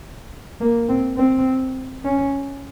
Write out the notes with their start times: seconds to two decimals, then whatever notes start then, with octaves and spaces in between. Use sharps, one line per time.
0.61 A#3
0.89 C4
1.17 C4
2.05 C#4